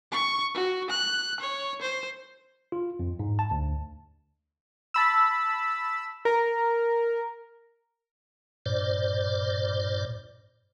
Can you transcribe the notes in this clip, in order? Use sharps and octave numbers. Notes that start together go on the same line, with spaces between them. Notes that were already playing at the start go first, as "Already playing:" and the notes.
C#6
F#4
F#6
C#5
C5
F4
F2
G#2
A5
D2
A5 B5 E6
A#4
G2 A#2 C5 D5